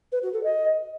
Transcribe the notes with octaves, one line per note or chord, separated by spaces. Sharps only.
B4
F#4
A4
D#5